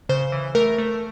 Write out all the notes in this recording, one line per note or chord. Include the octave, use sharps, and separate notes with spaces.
C#3 C5
E3
A3 A#4
A3